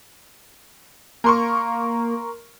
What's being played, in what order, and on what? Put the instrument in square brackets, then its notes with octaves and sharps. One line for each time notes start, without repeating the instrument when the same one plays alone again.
[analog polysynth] A#3 [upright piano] A#4 C6 C#6